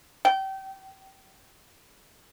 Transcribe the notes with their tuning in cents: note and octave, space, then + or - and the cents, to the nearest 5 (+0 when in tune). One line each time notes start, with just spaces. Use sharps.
G5 -30